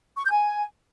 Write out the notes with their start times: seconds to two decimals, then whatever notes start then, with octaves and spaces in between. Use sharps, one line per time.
0.17 C#6
0.24 G6
0.31 G#5